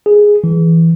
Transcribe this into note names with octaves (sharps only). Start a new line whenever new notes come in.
G#4
E3